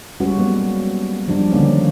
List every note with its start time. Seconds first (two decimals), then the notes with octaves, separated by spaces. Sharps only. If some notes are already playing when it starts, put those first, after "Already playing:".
0.20 G3 G#3 C#4 F#4 B4
0.38 F#3 A#3 B3
1.28 F3 G3 D4
1.52 D3 D#3 A#3 C#4